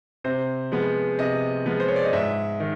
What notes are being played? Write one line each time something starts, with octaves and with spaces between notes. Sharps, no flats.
C3 C5
F3 G#3 B3
C3 D#5
F3 G#3 B3
C5
C#5
D5
D#5
G#2 E5
D#3